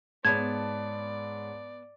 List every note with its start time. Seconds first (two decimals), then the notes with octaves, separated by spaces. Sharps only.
0.25 G#2 B3 C#5 D5 A5 G#6